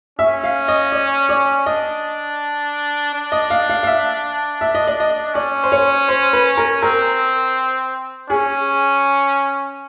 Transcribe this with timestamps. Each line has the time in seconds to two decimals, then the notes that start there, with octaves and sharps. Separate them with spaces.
0.19 C#4 E5
0.44 F5
0.68 D#5
0.92 D5
1.29 D5
1.66 D4 D#5
3.14 D4
3.32 D#5
3.50 F5
3.69 F5
3.83 F5
3.87 E5
4.61 E5
4.75 D#5
4.87 D5
5.00 D#5
5.34 C#4 D5
5.63 C5
5.72 C#5
6.08 C5
6.33 B4
6.57 A#4
6.82 C4 A#4
8.29 C#4 G#4